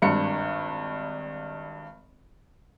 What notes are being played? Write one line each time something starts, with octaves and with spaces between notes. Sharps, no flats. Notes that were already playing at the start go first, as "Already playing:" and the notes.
G#1 G2 C#7